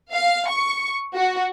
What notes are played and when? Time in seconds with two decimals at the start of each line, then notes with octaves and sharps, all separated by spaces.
0.14 F5
0.49 C#6
1.15 F#4